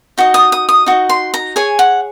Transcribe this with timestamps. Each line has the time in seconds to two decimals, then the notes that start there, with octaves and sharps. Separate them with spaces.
0.18 D#4 F#4 D#5
0.34 D#6
0.52 D#6
0.69 D#6
0.86 D#4 F#4 D#5
1.09 C6
1.34 A#5
1.56 G#4 C#5 G#5
1.79 F#5